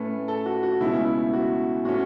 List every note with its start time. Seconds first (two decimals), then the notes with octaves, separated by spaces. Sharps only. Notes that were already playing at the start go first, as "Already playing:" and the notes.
Already playing: A2 A3 C#4 B4
0.28 A4
0.46 F#4
0.63 F#4
0.80 C#2 B2 A3 C#4 E4
1.05 E4
1.33 F#4
1.85 A2 A3 C#4 F#4